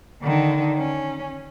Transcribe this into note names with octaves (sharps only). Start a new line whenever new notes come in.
D3 D#3
C#4